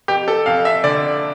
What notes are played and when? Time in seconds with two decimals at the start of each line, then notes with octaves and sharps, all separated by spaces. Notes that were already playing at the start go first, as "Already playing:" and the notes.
0.08 F2 G4
0.28 A4
0.46 F2 F5
0.65 E5
0.84 D3 D5